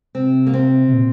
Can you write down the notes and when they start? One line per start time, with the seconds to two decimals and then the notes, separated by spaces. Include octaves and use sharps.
0.15 C3 C4
0.47 A#3
0.54 C4
0.88 C3
0.93 A#2